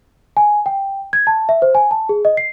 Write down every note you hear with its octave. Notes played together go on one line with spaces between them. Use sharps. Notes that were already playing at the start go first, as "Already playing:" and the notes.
G#5
G5
G#6
A5
E5
C5
G#5
A5
G#4
D#5
C7